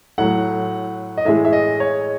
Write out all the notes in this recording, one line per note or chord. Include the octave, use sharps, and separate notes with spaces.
A2 F#3 A3 F#5
D#5
A2 E3 G#3 E5
E5
D#5
C#5